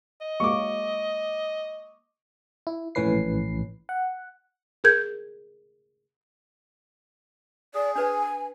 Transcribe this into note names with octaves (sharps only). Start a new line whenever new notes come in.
D#5
F#3 G#3 A#3 C#6 D6
E4
A#1 A2 E3 C#4 B4 C7
F#5
G#4 A#4 G6 G#6
G#4 D5
D4 B4 C5 G#5